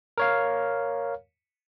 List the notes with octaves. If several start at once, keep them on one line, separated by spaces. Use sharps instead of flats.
A#4 C#5 F5